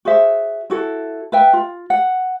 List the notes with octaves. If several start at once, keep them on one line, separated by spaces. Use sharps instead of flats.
F#4 G#4 C5 E5
E4 F#4 A4
B4 E5 G5
F4
F#5